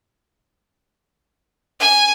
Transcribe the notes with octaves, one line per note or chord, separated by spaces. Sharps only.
G#5